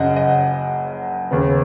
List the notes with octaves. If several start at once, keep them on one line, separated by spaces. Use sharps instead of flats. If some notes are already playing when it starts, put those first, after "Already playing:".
Already playing: F#1 F#2 C#3 D#5 F#5
D#5
D#2 C#3 B3